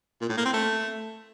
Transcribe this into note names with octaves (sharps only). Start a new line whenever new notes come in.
A#2
A2
A#3
C4
A3